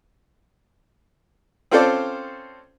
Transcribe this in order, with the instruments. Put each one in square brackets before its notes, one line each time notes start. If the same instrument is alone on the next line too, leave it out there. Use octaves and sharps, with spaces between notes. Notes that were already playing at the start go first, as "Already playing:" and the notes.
[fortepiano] C4 C#4 F4 A4 C5 D5